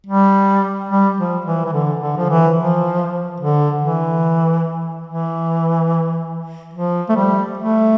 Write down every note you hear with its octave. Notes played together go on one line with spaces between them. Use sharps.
G3
G3
F3
E3
E3
D3
D3
F3
E3
F3
D3
E3
E3
F3
A3
G3
A3